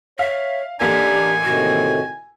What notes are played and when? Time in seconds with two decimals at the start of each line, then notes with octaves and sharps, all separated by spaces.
0.19 C#5 E5 F5
0.80 A1 A#3 D4 G4 A4 D5 G#5 A#5
1.44 A2 C3 D#3 F#4